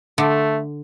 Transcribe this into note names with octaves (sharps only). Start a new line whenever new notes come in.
D3 A3